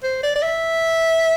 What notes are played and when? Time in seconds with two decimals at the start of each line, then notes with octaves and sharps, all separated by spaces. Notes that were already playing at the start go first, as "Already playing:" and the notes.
0.03 C5
0.23 D5
0.35 D5
0.42 E5